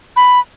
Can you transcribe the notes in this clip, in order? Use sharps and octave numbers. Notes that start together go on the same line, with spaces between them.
B5